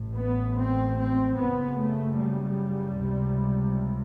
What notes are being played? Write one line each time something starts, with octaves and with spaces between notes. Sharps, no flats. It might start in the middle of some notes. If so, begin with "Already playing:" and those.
Already playing: A1 A2
B3
C4
C4
F#1 F#2 C#3 B3
A3
G3
C#2 C3